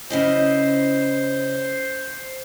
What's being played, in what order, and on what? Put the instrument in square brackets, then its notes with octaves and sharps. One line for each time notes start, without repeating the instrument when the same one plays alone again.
[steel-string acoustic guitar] C#3 E4 D#5 [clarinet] C5